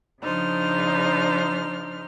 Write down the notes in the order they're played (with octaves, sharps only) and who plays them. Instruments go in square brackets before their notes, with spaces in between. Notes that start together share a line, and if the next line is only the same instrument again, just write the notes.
[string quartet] C#3 F3 D4 D#4 C5 F6